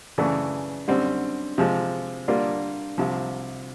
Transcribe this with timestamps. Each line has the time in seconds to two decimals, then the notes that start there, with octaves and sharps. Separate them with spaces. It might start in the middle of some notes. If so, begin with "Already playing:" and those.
0.18 F#2 C#3 E3 A3 D4
0.88 F#2 D3 G3 C4
1.58 C3 F3 G#3
2.28 D3 G3 A#3 D4 F4
2.98 C2 C3 F3